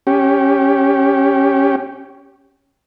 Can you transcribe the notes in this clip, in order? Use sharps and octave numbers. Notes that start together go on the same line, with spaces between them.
C#4 G4